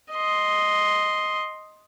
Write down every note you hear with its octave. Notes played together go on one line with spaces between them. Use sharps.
D#5 C6